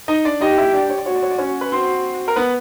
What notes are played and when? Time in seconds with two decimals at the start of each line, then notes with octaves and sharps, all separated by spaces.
0.08 D#4 D#5
0.25 D4 D5
0.41 D#4 G4 D#5
0.58 E4 E5
0.73 D4 D5
0.90 C#5
0.98 D5
1.06 F#4 C#5
1.15 D5
1.23 C#5
1.31 D5
1.38 C#4 C#5
1.61 B4
1.72 C4 F#4 C5
2.28 A#4
2.36 B3 B4